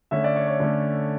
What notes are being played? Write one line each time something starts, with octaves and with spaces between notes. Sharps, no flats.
D3 A3 C#4 E5
D5
C#5
C#5
D3 A3 C#4